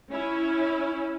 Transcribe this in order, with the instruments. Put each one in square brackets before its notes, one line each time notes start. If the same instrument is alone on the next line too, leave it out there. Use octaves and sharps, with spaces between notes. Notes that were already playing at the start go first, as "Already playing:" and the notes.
[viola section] C#4 E4